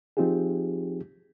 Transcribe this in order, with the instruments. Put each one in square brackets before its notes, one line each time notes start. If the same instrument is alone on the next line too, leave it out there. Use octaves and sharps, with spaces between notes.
[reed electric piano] F3 C4 D#4 F4 G4 G#4